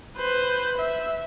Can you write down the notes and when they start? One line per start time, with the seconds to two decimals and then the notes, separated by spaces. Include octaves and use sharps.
0.17 B4 C5
0.78 E5